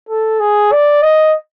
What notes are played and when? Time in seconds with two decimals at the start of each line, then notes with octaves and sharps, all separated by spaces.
0.09 A4
0.40 G#4
0.72 D5
1.03 D#5